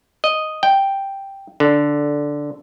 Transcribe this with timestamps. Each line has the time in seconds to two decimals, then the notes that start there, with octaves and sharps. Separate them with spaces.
0.24 D#5
0.63 G5
1.60 D3